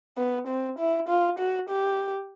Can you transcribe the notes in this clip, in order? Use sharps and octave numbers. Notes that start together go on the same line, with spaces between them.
B3
C4
E4
F4
F#4
G4